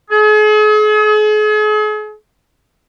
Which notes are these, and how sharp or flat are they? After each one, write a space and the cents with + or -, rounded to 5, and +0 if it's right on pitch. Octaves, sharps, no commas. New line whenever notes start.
G#4 +40